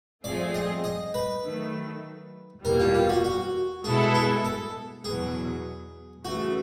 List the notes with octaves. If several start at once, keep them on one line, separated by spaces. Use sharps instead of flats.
F3 A3 C4 F4 G#4 D5
D#5
D#5
B4
D#3 F#3 A3
E2 B2 G3 A#3 A#4
F4
F4
F#4
F#4
B2 G#3 B3 E4 G#4 A4
G#4
A4
E2 B2 F#3 G#4
C#3 E3 A3 F#4